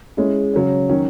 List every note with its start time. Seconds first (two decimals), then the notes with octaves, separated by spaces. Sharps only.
0.17 G#3 C#4 E4
0.54 C#3 F#3 C#4
0.89 D#3 F#3 C#4